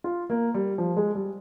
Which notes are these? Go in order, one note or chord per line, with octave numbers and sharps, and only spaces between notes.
F4
A#3
G3
F3
G#3
G3